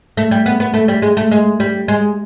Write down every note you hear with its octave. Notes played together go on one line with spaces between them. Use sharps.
A3
G3
B3
B3
A3
G3
G#3
A3
G#3
G3
G#3